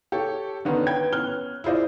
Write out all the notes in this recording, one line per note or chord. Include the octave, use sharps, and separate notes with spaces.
G4 A4 C#5
D3 D#3 B3 C#4 D#4 B4
B4 G5 G#6
B3 C#4 F6 F#6 G7
E4 F4 G#4 C5 D5 D#5